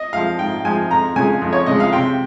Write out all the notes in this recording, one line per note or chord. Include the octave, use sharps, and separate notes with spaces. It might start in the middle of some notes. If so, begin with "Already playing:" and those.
Already playing: D#5
F3 G#3 F5
G#2 G5
F3 G#3 G#5
F2 A#5
C#3 G#3 G#5
F2
C#5
C#3 G#3 D#5
F5
C3 G5